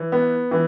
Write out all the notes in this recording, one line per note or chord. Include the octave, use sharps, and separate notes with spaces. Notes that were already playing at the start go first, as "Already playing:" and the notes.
Already playing: E3
B3
E3